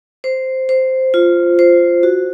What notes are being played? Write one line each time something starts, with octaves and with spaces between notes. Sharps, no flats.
C5
C5
F4
C5
F#4